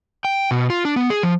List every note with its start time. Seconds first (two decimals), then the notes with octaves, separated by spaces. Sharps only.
0.25 G5
0.51 B2
0.70 F4
0.85 D4
0.96 B3
1.10 G#4
1.23 F3